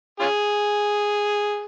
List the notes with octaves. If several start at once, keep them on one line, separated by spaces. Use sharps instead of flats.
C#4 F4 G#4